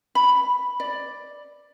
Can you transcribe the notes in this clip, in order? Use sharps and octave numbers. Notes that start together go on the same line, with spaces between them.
B5
D5